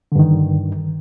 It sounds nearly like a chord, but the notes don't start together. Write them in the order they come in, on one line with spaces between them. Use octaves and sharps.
D3 G2 D#3